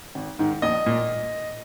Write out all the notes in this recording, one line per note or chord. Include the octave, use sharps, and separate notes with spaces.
G#1
G#2 D#3
A#1 D#5
A#2